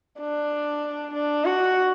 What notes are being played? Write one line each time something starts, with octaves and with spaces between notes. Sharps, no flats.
D4
D4
F#4